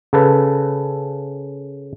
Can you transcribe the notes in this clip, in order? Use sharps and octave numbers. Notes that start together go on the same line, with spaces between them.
C#3 A4 B4